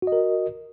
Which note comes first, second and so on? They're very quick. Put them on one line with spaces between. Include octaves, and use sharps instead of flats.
F#4 D#5 A#4